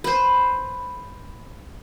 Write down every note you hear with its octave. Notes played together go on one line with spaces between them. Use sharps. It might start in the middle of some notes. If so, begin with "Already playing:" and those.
B4 C5